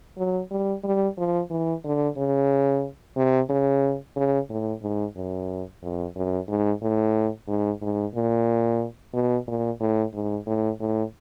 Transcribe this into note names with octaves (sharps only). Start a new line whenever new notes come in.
F#3
G3
G3
F3
E3
D3
C#3
C3
C#3
C#3
A2
G#2
F#2
F2
F#2
G#2
A2
G#2
G#2
A#2
B2
A#2
A2
G#2
A2
A2